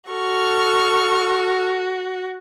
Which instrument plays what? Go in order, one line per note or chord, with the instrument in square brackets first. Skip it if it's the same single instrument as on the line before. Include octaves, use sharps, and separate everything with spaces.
[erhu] F#4 [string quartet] A4 C#6 F6